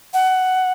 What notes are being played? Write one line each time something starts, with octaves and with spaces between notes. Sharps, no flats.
F#5